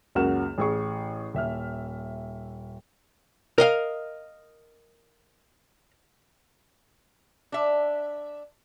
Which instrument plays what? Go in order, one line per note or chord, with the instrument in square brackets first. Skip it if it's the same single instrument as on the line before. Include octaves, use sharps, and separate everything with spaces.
[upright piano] C#2 F#2 A#3 F#4 F6 E7
A1 G#4 C#6
D#1 E5 F6
[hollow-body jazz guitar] A#4 D#5 F5
[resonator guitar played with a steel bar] D4 E5